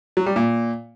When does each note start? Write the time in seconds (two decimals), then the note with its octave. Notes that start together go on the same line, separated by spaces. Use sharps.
0.17 F#3
0.26 G3
0.36 A#2